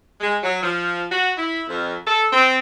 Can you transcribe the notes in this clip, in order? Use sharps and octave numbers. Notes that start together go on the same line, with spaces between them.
G#3
F#3
F3
F#4
E4
F2
A4
C4